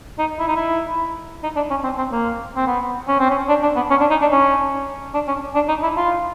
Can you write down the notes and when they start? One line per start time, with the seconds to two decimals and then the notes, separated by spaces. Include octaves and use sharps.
0.19 D#4
0.39 E4
0.48 D#4
0.56 E4
1.43 D#4
1.56 D4
1.70 C#4
1.84 C4
1.98 C4
2.12 A#3
2.57 C4
2.67 B3
3.08 C#4
3.19 C4
3.30 C#4
3.49 D4
3.63 D4
3.76 B3
3.90 C#4
4.00 D4
4.11 D#4
4.21 D4
4.32 C#4
5.14 D4
5.28 C#4
5.55 D4
5.69 D#4
5.83 E4
5.97 F4